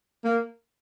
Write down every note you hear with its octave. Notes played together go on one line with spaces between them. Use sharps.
A#3